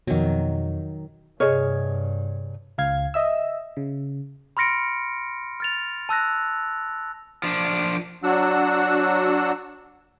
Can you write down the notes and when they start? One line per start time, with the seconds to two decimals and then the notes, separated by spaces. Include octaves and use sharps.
0.07 F2 B2 D#3 F#3
1.40 G2 C3 G#4 C#5 D#5 F6
2.78 C#2 F5 G#6
3.14 D#5 E5 E6
3.77 C#3
4.57 B5 C6 F6 A#6 C#7 D7
5.60 F6 A6 F7
6.09 A5 E6 F#6 A#6
7.43 F3 D4
8.23 F#3 D4 F#4 F#5 E6